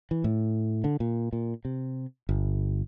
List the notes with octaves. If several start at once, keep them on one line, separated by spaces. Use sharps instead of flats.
E3
A2
D3
A#2
A#2
C3
G1